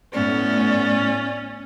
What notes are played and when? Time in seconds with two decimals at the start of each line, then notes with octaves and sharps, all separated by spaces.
0.13 A2 B3 C#4 D5